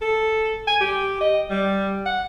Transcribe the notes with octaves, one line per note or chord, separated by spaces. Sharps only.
A4
G#5
G4
D#5
G3
F#5